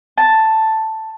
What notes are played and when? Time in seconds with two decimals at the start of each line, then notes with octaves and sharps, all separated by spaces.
0.18 A5